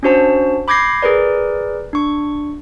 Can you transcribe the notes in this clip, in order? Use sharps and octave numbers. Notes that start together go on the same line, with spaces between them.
C#4 D4 F#4 C5 A5
B5 D6 G6 G#6 A#6 C7
G#4 A#4 B4 D5
D4 C#6